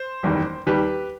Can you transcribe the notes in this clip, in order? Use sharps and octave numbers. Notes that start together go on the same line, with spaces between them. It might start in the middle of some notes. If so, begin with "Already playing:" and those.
Already playing: C5
F#1 E2 D#3 G3
D#2 D#3 G3 G4 B4